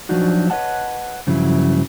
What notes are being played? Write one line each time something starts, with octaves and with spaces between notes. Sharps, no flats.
F3 F#3 D4 D#4 F#4
B4 C#5 D#5 F#5 A5
G2 C#3 F3 F#3 E4